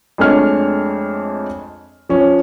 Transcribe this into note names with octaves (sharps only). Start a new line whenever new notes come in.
F2 G#3 A3 D4 C#5 F6
F3 C#4